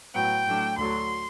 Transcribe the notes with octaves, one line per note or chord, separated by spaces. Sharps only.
A2 F#3 B3 G5
A2 F#3 A3 D4
D2 D3 F#3 C6